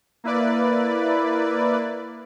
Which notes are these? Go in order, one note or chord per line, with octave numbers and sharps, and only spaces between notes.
A#3 E4 B4 D5